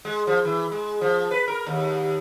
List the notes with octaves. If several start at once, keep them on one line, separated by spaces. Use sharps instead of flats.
G#3
F3
E3
G#3
F3
B4
A#4
D#2